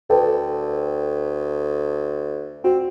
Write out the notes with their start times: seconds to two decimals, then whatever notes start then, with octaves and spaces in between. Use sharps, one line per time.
0.10 D2 A4 B4 G5
2.64 C4 F#4